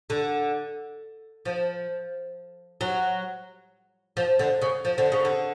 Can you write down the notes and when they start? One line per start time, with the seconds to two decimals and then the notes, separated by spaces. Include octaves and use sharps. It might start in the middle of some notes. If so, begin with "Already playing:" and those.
0.10 D3
1.45 F3
2.81 F#3
4.17 F3
4.39 D3
4.61 C#3
4.85 F3
4.98 D3
5.12 C#3
5.25 D3